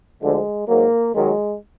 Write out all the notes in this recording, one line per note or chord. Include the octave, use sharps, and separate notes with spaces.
D2 D3 F3 G#3
G#2 F#3 A#3
D#2 D#3 F#3 G#3